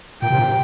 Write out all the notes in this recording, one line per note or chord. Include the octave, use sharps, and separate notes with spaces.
A#2 G5
C3
A#2